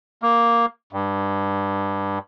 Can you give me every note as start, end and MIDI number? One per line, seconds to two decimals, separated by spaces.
0.22 0.66 58
0.93 2.19 43